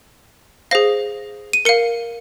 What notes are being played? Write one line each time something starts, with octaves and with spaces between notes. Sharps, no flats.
G#4 C5 F5 A#6
D#7
A#4 F5 C#7